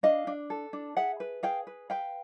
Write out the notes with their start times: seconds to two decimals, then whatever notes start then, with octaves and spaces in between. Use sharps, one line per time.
0.03 D4 D#5 F5
0.27 D4
0.50 A4
0.73 D4
0.97 G#4 E5 F#5
1.20 B4
1.43 G#4 F5 G5
1.67 B4
1.90 B4 F5 G5